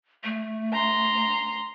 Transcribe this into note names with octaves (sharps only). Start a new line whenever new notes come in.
A3
A#5 C6